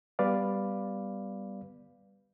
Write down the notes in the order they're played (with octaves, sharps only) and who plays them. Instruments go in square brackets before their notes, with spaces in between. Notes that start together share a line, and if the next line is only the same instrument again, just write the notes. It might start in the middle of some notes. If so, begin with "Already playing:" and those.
[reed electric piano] G3 B3 B4 D5 F5